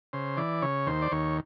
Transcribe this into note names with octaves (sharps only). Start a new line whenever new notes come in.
C#3 C5
E3 D5
C#3 C#5
D#2 C5
D5
D#2 C#5